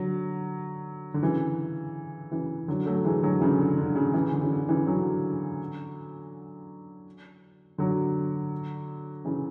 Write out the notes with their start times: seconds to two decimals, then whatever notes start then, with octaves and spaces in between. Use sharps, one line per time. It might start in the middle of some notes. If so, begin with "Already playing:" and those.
Already playing: D3 F#3
1.14 D3
1.23 C#3 E3
2.31 C#3 E3
2.68 D3 F#3
2.86 F#3 A3
3.04 E3 G#3
3.23 D3 F#3
3.40 C#3 E3
3.59 D3
3.78 D3
3.95 C#3
4.13 C#3 E3
4.33 D3
4.42 C#3
4.51 D3
4.68 C#3 E3
4.86 D3 F#3
7.78 D3 F#3
9.25 C#3 E3